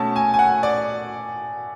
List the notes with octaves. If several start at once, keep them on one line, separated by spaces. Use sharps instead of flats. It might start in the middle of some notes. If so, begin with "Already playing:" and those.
Already playing: B2 A3 C#4 A5
G#5
G#5
F#5
D5